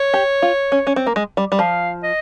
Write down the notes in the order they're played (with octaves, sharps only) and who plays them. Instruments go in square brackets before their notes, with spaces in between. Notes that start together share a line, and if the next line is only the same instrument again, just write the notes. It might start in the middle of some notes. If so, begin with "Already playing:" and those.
Already playing: [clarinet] C#5
[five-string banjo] G4
F4
C#4
C#4
C4
A#3
G#3
G3
G3
[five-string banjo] F3 [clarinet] F5
[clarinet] D#5